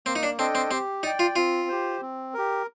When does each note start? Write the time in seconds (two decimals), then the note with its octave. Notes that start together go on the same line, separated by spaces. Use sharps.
0.06 A#3 C4
0.16 D#4
0.23 D4
0.38 C4 D4 A4 D#5 G5
0.55 C4
0.71 C4 G4
1.03 D#4 D5 G5
1.19 F4
1.36 C4 F4
1.69 G4 C5
2.02 C4
2.34 G4 A#4